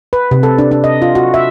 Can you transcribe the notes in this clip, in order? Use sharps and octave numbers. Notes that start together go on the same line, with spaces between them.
B4
C3
A4
D4
D4
D#5
F4
F#4
E5